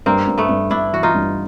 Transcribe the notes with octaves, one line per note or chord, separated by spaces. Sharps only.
G2 A#3 C4
G2
A3 B3
G2
G2 D4 E4
E3 F#4
D#4 F4
G2